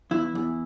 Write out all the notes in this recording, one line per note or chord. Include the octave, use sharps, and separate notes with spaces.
E2 E4
E2